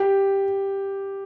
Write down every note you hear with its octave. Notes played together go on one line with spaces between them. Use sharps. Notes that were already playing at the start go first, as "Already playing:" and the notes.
Already playing: G4